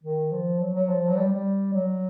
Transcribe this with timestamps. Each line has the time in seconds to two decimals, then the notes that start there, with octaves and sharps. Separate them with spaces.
0.04 D#3
0.32 F3
0.60 F#3
0.75 F#3
0.89 F3
1.08 F#3
1.16 G3
1.31 G3
1.74 F#3